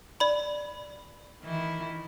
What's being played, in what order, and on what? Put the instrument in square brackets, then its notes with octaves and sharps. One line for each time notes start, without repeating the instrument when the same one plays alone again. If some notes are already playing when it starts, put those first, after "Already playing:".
[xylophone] D5 B5
[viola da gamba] D#3 E3 E4